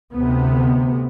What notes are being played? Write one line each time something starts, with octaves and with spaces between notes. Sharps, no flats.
D2 C3 B3